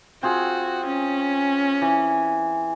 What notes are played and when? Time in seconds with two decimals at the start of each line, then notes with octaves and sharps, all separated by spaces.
0.23 C4 F4 F#4 G#4
0.87 C#4
1.82 E3